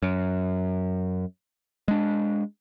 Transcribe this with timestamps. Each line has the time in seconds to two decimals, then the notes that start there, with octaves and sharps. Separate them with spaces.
0.02 F#2
1.88 G#3 D4